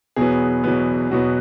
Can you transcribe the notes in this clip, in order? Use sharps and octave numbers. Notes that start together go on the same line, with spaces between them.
E2 B2 F#3 B3 G#4
E2 B2 F#3 B3
E2 B2 F#3 B3 F#4